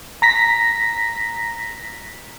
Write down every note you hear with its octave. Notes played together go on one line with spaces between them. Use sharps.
A#5 A#6 B6